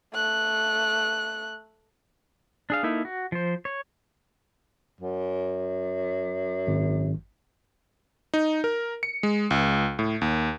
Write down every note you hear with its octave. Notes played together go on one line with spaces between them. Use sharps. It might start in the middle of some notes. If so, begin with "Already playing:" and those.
A3 F#6
D4 G#4 F5
A#3 D#4 E4 A4
F#4
F3 C5
C#5
F#2
G#1
D#4
A#4
C#7
G#3
C#2
A2
D#2